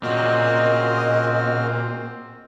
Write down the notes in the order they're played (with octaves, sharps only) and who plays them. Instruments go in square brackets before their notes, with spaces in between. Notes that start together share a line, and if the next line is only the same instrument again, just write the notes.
[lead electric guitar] A#2 [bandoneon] C#3 F#4 F6 [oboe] C4 [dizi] D#5